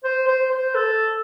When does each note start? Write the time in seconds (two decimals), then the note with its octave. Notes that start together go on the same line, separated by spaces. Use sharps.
0.04 C5
0.28 C5
0.52 C5
0.75 A4